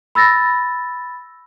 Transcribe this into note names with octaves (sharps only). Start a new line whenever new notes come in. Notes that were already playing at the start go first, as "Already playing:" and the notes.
B5 E6 A6 A#6